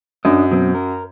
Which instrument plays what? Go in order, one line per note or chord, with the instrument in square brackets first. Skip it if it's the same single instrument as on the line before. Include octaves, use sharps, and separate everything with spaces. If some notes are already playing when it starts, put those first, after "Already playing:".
[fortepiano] F#2 [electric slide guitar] D4 D#5
[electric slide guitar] B2 F#3 C4
A#4